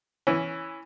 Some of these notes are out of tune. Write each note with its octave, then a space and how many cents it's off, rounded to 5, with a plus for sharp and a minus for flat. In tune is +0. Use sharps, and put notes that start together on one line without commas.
E3 +0 C#4 +0